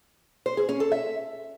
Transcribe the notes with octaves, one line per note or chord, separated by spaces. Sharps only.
C5
G#4
C#4
A4
E5